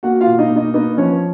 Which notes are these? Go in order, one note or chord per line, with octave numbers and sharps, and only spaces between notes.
A#3 F#4 F#5
F4 F5
B2
D#4 D#5
A#3
D#4 D#5
B3 D#4 D#5
F3 C#4 C#5